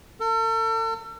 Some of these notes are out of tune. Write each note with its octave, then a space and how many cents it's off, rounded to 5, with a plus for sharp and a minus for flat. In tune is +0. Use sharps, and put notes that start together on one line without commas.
A4 +40